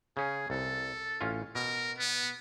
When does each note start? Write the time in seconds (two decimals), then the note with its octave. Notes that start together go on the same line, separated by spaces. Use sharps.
0.17 C#3 C#4 G#4
0.50 C2 A4
1.21 A1 C#4 F4
1.55 B2 A#4
1.98 B3